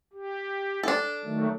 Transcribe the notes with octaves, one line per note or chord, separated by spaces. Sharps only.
G4
D4 A4
D#3 F#3 A3